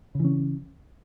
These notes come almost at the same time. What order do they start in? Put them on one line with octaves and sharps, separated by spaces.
C#3 E3 C#4